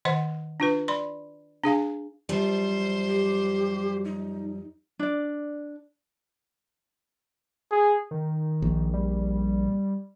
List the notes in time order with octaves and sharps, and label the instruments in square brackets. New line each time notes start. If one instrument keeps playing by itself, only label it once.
[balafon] D#3 C5 D#5 F#5 C6
D4 F4 B4
D5 B5 C6
D4 G#4 F5 G#5
[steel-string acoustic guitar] F#2 F3 G3 [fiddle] C5
[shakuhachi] G4
D#4
[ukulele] D4 D5
[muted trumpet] G#4
[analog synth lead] D#3
[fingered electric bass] A#1
[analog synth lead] G3